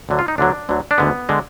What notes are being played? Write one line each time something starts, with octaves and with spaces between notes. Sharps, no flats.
D2 D3 F#3
F4
D#4
D2 D3 F#3 D4
D2 D3 F#3
D4
D2 D3 G#3 B3
D3 G#3